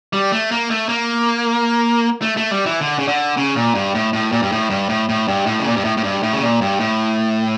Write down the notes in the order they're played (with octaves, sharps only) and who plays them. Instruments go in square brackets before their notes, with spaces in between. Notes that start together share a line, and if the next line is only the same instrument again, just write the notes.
[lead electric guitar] G3
A3
A#3
A3
A#3
A3
A3
G3
E3
D3
C#3
D3
C#3
A#2
G2
A2
A2
A#2
G2
A2
G2
A2
A2
G2
A2
C#3
A#2
G2
A2
A2
G2
A2
C#3
A#2
G2
A2